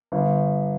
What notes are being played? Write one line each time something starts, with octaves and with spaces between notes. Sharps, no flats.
G1